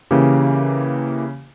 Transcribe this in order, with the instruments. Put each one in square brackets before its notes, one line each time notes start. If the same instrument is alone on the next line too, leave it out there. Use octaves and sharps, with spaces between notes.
[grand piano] C#3 [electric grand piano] E3 A#3 G4